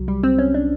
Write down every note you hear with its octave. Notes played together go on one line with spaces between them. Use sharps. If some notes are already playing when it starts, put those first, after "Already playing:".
Already playing: C2 F#3
G3
C4
C#4
D4